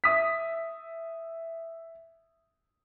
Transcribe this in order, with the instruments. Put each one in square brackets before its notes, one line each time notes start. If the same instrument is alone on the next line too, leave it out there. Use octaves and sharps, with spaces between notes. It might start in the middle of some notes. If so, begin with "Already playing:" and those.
[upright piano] E5 D#6 B6